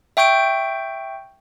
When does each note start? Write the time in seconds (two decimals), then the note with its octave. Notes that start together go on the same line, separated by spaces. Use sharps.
0.17 E5 G5 C#6 G6 D7